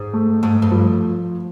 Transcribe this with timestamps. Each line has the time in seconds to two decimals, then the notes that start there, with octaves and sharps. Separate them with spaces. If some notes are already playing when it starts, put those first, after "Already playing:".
Already playing: G#2
0.14 A3
0.43 G#2 A3
0.62 G2
0.72 F3